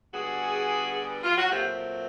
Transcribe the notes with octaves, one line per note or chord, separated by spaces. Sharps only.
D3 G3 B3 F#4 G#4
F4
F#4
A#2 F#3 A3 C4 F4 G4